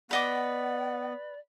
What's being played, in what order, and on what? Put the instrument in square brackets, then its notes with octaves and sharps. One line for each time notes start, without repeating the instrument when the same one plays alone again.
[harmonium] B3 [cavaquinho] B4 D#5 D6 [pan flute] D5 [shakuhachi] F#5